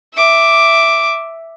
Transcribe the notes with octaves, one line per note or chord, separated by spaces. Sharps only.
E5 D6